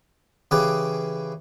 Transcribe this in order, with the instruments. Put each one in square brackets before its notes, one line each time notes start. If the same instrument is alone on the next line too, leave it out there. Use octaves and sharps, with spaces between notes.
[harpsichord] C#3 E3 G4 G#4 B4